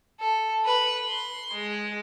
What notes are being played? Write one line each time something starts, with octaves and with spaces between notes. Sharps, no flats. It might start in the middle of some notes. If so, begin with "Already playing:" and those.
A4
B4
C6
G#3